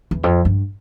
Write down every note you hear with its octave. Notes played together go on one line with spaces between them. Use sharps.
E2
F2
G2